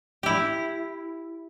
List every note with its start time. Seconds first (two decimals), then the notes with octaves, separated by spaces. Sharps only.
0.23 E4 G4